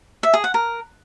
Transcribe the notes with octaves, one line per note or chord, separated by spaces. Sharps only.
E5
G#4
F#5
A#4